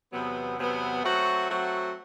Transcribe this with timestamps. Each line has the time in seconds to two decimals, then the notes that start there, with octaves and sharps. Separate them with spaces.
0.11 E2 C3 F#3 B3
0.57 E2 C3 F#3 B3
1.02 F#3 A3 C4 F#4
1.48 F#3 A3 C4 F#4